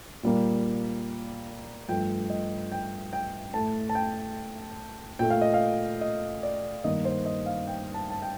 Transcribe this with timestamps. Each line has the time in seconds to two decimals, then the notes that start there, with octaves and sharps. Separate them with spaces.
0.23 A#2 G3 A#3
1.88 G2 F3 A3 G5
2.30 D#5
2.72 G5
3.13 G5
3.54 A2 A3 A5
3.89 A5
3.95 G5
5.19 A#2 A3 G5
5.30 F5
5.41 D#5
5.54 F5
6.01 D#5
6.43 D5
6.84 G2 D#3 G3 A#3 D#5
7.05 C5
7.26 D#5
7.46 F5
7.67 G5
7.94 A5
8.10 A5
8.22 G5